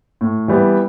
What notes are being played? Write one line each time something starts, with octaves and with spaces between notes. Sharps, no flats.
A2
E3 G3 B3